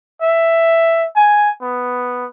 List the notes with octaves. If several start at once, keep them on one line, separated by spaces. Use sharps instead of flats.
E5
G#5
B3